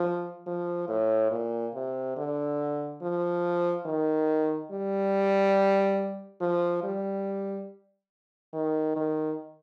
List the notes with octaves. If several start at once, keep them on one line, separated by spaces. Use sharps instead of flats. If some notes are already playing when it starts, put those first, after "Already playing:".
Already playing: F3
F3
A2
A#2
C3
D3
F3
D#3
G3
F3
G3
D#3
D#3